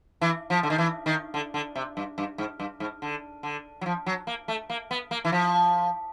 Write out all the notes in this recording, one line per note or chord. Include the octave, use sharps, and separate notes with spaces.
E3
F3
D3
D#3
E3
D#3
D3
D3
C3
G2
G2
G#2
G2
G#2
D3
D3
F#3
F3
F#3
A#3
A3
A#3
B3
A#3
E3
F3